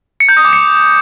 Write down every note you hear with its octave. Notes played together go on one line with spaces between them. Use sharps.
C#7
G6
D#6
D6
C#7